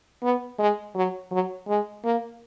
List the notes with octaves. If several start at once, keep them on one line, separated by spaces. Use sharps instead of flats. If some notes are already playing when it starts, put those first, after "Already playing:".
B3
G#3
F#3
F#3
G#3
A#3